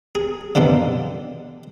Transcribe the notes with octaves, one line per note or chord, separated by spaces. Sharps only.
G#4
F#2 B2 D3 D#3 F3